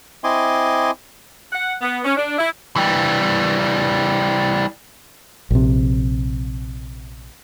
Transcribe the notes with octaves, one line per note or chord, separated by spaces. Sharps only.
C4 E4 D#5 G#5 C6 D6
F#5
B3
C#4
D4
E4
E3 G3
A#1 C3